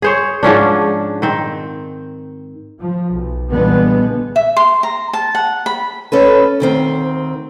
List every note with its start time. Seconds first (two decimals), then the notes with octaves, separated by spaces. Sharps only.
0.02 G#4 C5 C#5
0.43 G#2 F3 C#4 D4
1.22 D#3 C4
2.80 F3
3.12 B1
3.51 A#2 D3 E3 G3 G#3 B3
4.36 E5
4.57 C6
4.83 A#5
5.13 A5
5.35 F#5
5.66 B5
6.12 C#4 A4 B4
6.60 D2 D#3 C4